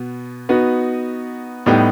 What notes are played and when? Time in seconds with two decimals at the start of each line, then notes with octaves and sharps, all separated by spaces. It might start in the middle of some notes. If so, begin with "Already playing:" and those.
Already playing: B2 B3
0.49 B3 D#4 F#4 B4
1.66 A2 G3 B3 D#4 G4